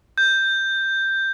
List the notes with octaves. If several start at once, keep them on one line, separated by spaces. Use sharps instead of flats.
G6